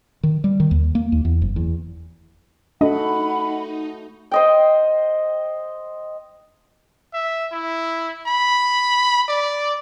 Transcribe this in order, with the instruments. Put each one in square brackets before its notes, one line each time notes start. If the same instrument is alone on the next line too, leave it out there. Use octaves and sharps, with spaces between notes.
[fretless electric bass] D#3
G3
D#3
D#2
A#3
D#2
E2
F#1
E2
[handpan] A3 F#4 A4 [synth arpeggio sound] D4 D#5 [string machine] D#4 [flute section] F#5 B5
[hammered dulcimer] C5 D#5 G5
[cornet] E5
E4
B5
D5